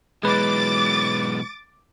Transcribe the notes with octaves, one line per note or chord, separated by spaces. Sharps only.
B2 E3 F#3 G#3 B4 D6 A6